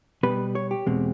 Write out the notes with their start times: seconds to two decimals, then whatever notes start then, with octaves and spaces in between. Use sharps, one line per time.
0.23 B2 G3 B3 B4
0.55 C#5
0.71 G4
0.86 E2 B2 G#3 C4